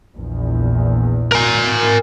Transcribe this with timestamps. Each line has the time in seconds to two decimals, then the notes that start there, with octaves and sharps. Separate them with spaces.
0.16 A#1 E2
1.32 A#4 G#5